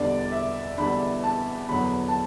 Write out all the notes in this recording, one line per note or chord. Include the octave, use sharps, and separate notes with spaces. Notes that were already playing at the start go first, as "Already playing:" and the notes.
Already playing: E1 E2 D3 G3 D4 D5
E5
E1 E2 D3 G3 D4 B5
A5
E1 E2 D3 F#3 B3 B5
A5